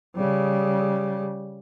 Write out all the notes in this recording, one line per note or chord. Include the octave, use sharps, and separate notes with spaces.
C#3 G3